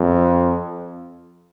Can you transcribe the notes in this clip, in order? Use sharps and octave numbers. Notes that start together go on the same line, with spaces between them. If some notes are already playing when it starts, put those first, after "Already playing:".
Already playing: F2